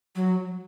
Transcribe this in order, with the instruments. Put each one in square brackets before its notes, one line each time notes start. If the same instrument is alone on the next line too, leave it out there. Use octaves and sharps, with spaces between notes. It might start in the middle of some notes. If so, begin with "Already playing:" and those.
[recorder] F#3